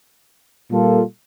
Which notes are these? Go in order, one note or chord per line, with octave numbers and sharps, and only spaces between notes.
A#2 G3 A#3 F4 A4